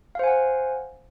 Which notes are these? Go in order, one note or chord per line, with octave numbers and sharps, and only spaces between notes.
C5 F5 F#5 G#5